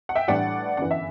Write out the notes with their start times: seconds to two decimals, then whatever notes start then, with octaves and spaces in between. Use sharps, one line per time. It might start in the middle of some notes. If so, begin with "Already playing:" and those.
0.09 F#5
0.15 E5 G5
0.28 A2 E3 G3 D4 D5 F#5
0.77 G1 F#2 E3 F#5
0.91 E5